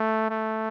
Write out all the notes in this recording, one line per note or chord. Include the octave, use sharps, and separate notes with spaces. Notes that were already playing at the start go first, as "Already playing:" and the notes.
Already playing: A3
A3